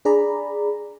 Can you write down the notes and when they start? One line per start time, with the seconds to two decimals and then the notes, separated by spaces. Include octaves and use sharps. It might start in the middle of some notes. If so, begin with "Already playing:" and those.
0.05 D4 G#4 D5 A#5 B5